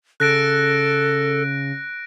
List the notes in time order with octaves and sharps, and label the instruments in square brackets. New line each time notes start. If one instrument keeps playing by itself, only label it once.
[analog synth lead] C#3 [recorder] A4 [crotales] F#6 A#6 D7